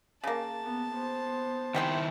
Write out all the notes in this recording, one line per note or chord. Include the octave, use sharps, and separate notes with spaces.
C#3 A#3 A5
B3
B3 C5
C3 D#3 E4 G5 C6